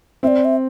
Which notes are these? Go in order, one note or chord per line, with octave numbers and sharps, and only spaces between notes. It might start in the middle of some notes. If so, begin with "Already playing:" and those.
C4 D5 E5
E5